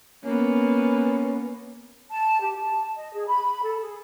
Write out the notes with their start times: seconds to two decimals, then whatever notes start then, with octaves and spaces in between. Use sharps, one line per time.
0.25 A#3 B3 C#4
2.10 A5
2.41 G4
2.56 A5
2.95 D#5
3.13 G#4
3.27 B5
3.63 A4
3.81 G#4